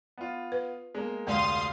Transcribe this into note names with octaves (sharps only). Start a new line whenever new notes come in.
B3 F4
B4
G#3 A#3 B3
F1 D2 G#3 F5 C6 D#6